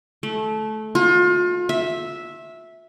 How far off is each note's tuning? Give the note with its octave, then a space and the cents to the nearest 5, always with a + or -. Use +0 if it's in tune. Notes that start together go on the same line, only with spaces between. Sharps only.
A3 -20
F4 +35
E5 -5